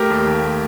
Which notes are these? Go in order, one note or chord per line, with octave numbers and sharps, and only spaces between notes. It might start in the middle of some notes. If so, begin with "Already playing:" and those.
Already playing: A3 G4 A#4
D#2
D#2
A3